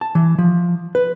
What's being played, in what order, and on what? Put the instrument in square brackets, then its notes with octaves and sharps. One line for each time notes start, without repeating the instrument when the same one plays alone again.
[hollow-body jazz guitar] A5
E3
F3
B4